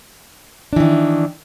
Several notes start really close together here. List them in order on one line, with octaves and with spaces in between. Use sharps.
D4 E3 D#3